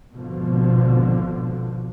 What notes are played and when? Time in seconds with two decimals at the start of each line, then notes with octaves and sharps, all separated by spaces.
0.13 G#1 B2 D3 F3